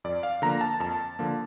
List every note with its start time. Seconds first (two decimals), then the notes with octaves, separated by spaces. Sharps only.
0.04 F2 D5
0.23 F5
0.42 D3 F3 A#3 A#5
0.61 A5
0.80 F2 A5
1.19 D3 F3 A#3